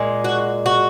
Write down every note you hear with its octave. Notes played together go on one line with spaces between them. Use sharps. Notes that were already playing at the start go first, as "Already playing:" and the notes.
Already playing: A#2 G#3
F#4
F#4